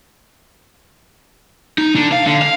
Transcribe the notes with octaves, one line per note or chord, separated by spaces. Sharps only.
D#4
D3
F5
D3
F5